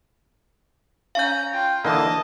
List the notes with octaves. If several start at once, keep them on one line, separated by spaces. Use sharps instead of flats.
C#4 F5 A#5 G6
F4 G5
D3 E3 A#3 D#5 A5